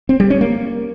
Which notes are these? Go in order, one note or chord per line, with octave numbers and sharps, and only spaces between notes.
C4
G3
C#4
A#3